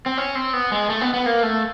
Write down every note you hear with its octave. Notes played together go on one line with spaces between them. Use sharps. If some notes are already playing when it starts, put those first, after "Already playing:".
C4
C#4
C4
B3
G#3
A3
B3
B3
A#3
A3